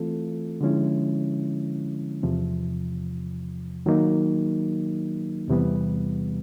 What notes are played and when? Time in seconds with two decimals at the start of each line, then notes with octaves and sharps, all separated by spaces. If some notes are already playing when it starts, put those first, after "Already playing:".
Already playing: E3 A3 C4 F4 A4
0.61 D3 F3 G#3 C#4 E4
2.23 E2 C3 F3
3.86 D#3 F#3 A#3 D#4
5.48 E2 C3 E3 G3 B3